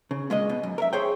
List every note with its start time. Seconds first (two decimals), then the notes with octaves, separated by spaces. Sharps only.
0.11 C#3
0.30 A#2 G#3 C#4 D#5
0.49 B2
0.63 F#2
0.78 A#4 E5
0.93 G#4 C5 C#5 G5